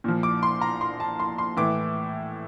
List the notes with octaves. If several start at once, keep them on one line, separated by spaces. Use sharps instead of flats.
A#2 F3
D6
C6
A#5
C6
A5
C6
C6
A2 E3 D6